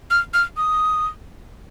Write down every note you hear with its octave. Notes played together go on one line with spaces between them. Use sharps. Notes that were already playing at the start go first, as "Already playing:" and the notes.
F6
F6
D#6